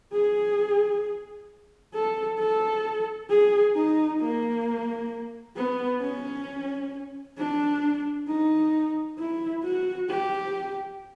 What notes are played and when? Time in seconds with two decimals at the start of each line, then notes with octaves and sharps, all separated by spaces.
0.13 G#4
1.94 A4
2.39 A4
3.30 G#4
3.75 D#4
4.21 A#3
5.56 B3
6.01 C#4
7.38 D4
8.28 D#4
9.19 E4
9.64 F#4
10.09 G4